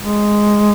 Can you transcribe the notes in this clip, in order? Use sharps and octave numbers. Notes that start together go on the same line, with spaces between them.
G#3